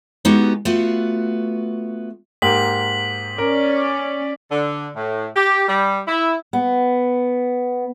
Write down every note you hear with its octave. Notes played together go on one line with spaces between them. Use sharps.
G#3 B3 D#4 F#4 G4
A3 B3 F4 F#4
G#2 A#3 G4 B6 F#7
C#4 A#4 D5
D3
A2
G4
G3
E4
B3